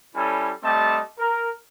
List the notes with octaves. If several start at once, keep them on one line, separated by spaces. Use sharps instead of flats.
G3 C#4 E4 A4 G#5
G3 A3 C4 G4 D#5 A5
A#4